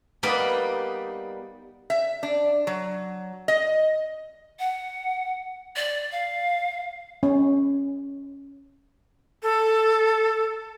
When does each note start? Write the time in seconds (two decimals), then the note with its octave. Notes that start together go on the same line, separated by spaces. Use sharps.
0.23 G3 A#3 B3 D#4 B4 D5
1.90 E5
2.23 D4
2.67 F#3
3.48 D#5
4.59 F#5
5.76 D5
6.12 F5
7.23 C#4
9.43 A4